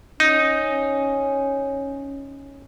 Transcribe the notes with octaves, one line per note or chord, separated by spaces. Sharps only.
C#4 D#4